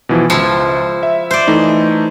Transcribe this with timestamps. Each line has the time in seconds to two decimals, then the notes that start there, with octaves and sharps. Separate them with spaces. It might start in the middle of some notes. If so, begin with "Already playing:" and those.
0.09 B2 E3 F3
0.30 C#2 F3 E4
1.03 E5
1.31 C5 D5
1.48 E3 A3 D#4